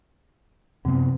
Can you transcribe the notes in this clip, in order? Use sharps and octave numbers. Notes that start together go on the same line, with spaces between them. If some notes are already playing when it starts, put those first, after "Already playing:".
F#2 C3 F3 B3